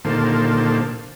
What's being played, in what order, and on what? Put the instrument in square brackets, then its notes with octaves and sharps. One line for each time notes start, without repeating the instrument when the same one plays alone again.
[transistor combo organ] A#2 D3 D#3 A#3 C5 A5